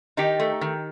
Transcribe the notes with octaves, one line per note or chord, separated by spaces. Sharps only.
D#3 D#4 G4
A3
D#3